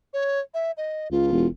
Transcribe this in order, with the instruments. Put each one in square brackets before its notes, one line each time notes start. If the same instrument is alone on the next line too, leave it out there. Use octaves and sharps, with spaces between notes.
[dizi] C#5
E5
D#5
[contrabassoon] C#2 [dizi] F4
[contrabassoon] E1